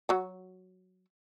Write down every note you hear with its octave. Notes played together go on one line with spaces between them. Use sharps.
F#3 F#4